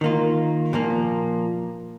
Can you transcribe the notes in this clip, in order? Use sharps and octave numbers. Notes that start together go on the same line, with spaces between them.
D#3 A#3 F4
A#2 F3 A#3